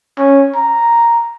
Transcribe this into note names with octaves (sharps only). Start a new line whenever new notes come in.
C#4
A#5